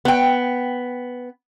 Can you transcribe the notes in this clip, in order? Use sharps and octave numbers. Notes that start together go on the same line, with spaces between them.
B3 G5